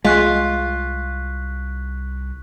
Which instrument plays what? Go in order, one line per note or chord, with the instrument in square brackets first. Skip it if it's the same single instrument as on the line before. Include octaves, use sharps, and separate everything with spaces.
[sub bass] C2 [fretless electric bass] G#3 [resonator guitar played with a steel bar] F4 [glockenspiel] C#6 F#6 B6